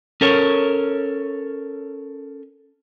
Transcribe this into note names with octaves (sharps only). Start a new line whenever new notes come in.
C#4 A4 A#4 C#5